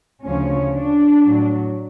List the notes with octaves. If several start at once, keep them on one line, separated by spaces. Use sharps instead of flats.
D2 C#3 F3 C#4
D4
A2 F#3